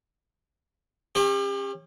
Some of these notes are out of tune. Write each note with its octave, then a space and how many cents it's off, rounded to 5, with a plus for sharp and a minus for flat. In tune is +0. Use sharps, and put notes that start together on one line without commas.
C#4 -25 G4 +35